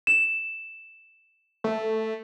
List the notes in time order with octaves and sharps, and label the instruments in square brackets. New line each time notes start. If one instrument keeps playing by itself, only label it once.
[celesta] E7
[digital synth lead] A3